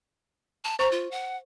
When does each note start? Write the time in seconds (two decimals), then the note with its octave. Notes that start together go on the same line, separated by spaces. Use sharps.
0.64 A5
0.79 C5 A#5 C#6
0.92 F4
1.11 F#5